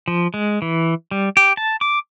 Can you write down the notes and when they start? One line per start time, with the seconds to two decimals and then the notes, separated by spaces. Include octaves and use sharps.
0.08 F3
0.34 G#3
0.62 E3
1.11 G3
1.37 G4
1.57 A5
1.81 D6